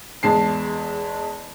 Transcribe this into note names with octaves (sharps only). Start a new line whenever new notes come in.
E2 G#3 A5 C7